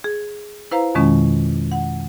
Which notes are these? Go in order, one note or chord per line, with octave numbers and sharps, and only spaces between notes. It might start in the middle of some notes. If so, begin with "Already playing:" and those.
G#4
E4 B4 C5 F5 A#5
F2 B2 D#3 G#3 C#4
F#5